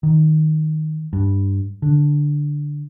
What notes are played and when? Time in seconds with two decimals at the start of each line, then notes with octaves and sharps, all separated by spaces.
0.03 D#3
1.13 G2
1.82 D3